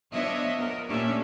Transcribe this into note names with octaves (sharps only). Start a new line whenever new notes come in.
F3 B3 D4 C#5 D#5 E5
B3 A#4
A#2 A3 C#4 D4 G4 E5